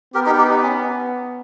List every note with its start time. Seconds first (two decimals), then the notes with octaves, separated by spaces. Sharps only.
0.14 B3 G4 A#4
0.26 D#4 G4
0.38 D#4 G4
0.50 D#4
0.63 C#4